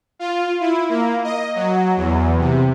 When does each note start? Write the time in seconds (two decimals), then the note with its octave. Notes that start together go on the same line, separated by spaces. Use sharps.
0.19 F4
0.60 E4
0.89 A#3
1.24 D#5
1.55 F#3
1.97 E2
2.39 C3